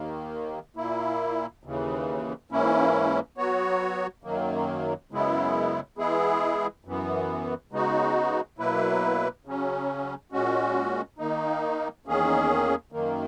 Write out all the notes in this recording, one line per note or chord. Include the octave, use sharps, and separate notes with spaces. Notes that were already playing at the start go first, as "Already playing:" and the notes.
Already playing: D#2 D#3 A#3
A#2 A#3 E4
D#2 C#3 E3
G#2 E3 A#3 C#4 E4
F#3 B3 F#4 C#5
F#2 D#3 F#3 A#3
F#2 C#3 G#3 B3 E4
E3 G#3 B3 E4 G#4
F#2 E3 B3
C#3 G#3 B3 D#4 F#4
B2 F#3 A#3 E4 B4
C#3 F#3 C#4
A#2 G#3 C#4 F#4
D#3 A#3 D#4
E2 D#3 A#3 C#4 G#4
F#2 D#3 A#3